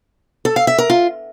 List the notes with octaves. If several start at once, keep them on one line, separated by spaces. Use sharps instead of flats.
A4
F5
E5
A#4
F4